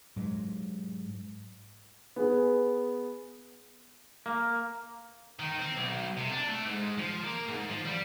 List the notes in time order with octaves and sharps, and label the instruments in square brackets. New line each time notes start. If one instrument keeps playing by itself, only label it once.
[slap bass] G#2 F#3
[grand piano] B3 G#4
[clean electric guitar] A#3
[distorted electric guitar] D#3
C4
B1
C3
D4
A3
G#2
F3
A#3
G#2
F3
G3